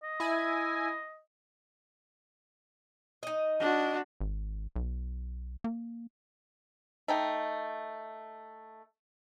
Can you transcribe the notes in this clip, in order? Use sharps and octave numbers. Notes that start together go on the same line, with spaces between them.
D#5
E4 G#5
D#4 D#5
D4 F#4
G#1
B1
A#3
A3 D#4 G5